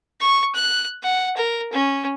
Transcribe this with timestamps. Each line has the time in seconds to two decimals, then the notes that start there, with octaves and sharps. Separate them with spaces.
0.21 C#6
0.55 F#6
1.03 F#5
1.37 A#4
1.73 C#4